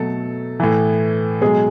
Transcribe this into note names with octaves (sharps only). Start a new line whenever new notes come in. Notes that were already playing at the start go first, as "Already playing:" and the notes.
Already playing: B2 F#3 A3 A4
A2 E3
B2 F#3 G#3 G#4